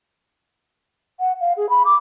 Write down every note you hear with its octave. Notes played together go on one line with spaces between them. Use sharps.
F#5
F5
G#4
B5
D6